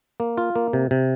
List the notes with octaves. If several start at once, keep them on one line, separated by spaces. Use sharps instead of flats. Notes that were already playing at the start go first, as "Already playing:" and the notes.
A#3
F4
A#3
C3
C3